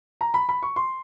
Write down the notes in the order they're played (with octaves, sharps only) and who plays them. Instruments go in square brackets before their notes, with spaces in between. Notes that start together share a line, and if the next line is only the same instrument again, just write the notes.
[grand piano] A#5
B5
B5
C#6
C6